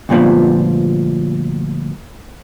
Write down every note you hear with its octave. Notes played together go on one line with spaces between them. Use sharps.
D2 G2 A#2 F3 B3